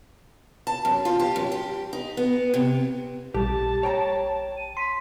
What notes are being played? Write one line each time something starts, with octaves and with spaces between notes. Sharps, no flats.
A5
F#2
F4
G4
F#2
G4
D#4
B3
C3
A#1 G3 G4 A5
C#5 G5 A#5
D#7
C6 B6